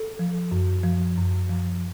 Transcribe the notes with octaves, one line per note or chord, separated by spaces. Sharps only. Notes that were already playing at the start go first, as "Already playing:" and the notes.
Already playing: A4
F3
F#2
F3
F#2
F3